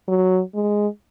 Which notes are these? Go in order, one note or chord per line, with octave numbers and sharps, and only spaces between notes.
F#3
G#3